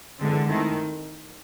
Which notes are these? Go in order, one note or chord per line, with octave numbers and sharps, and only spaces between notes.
D3 E3 G#3 C4
D#3 A3 C4 E4 A4